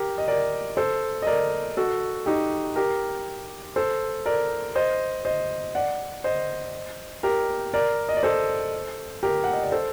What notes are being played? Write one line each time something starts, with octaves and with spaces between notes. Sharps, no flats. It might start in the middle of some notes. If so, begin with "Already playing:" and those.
Already playing: G4 A#4
D#5
A#4 D5
A4 C5
D#5
A#4 D5
F#4 A4
D#4 G4
G4 A#4
A4 C5
A#4 D5
C5 D#5
C5 D#5
D5 F#5
C5 D#5
G4 A#4
A#4 D5
D#5
D5
A4 C5
G4 A#4
F#5
D#5
D5
A4 C5